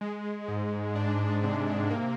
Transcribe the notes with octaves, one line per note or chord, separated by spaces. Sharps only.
G#3
G#2
D4
C3
A#3